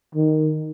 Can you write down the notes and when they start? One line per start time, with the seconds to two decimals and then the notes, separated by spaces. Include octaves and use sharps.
0.15 D#3